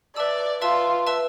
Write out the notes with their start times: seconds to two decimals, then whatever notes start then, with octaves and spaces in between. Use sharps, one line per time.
0.16 B4 D5 E5 A5 E6
0.62 F4 B4 E5 A5 E6
1.07 B4 E5 A5 E6